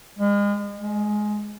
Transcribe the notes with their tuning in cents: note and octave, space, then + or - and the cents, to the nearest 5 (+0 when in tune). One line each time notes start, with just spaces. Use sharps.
G#3 -35
G#3 +15